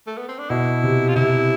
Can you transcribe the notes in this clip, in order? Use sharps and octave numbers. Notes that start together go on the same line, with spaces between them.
A3
B3
C4
D4
B2 E4
C3
F4
C3 E4